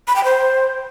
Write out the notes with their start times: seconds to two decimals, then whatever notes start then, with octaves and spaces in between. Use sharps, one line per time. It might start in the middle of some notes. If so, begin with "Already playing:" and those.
0.08 B5
0.16 G5
0.24 C5